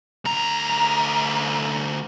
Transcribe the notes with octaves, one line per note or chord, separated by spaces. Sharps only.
D2 A#5